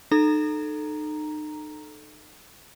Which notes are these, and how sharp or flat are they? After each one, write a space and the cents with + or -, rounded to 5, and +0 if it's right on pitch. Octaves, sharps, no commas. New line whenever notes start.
D#4 -35 A4 -10 A#5 +0